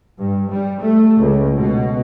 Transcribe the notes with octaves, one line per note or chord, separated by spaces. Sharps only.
G2
G3
A3
C#2
B2